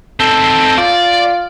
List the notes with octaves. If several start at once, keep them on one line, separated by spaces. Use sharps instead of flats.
C4 D#4 A4
F4 D5